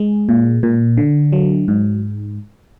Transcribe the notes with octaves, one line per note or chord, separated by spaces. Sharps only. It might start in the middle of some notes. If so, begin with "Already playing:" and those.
Already playing: G#3 G#4
A#2
A#2
D3
F#3
G#2